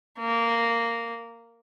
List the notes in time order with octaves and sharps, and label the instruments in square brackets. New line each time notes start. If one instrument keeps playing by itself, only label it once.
[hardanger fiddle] A#3